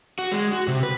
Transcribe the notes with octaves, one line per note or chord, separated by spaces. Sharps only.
F#4
G#3
F#4
C3
B4